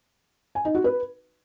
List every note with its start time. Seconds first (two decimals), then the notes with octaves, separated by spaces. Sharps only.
0.55 G#5
0.65 D#4
0.75 F#4
0.84 B4